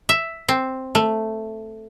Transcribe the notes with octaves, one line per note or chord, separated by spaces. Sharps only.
E5
C4
A3